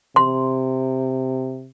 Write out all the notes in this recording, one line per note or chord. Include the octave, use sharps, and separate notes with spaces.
C3 C6